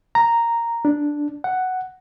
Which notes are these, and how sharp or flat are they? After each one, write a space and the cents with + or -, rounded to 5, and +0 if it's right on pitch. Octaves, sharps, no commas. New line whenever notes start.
A#5 -5
D4 +0
F#5 +5